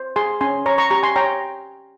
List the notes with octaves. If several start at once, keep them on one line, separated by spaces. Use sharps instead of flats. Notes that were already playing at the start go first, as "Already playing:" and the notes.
Already playing: C5
G#4 G#5 C6
C#4 G#5 C6
C#5 A#5 C#6
A#5 C#6
G4 A#5 C#6
G#5 C6
C#5 G5 A#5